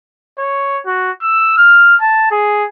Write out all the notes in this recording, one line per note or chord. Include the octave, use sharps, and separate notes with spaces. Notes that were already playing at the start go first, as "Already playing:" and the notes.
C#5
F#4
E6
F6
A5
G#4